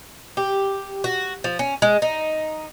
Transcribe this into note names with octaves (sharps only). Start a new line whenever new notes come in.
G4
F#4
F3
C#4
G#3
D#4